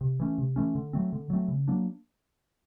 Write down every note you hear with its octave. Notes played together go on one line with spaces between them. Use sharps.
C3
E3 A3 C#4
C3
E3 A3 C#4
D3
F#3 A3 C4
D3
F#3 A3 C4
C#3
F#3 A#3 D4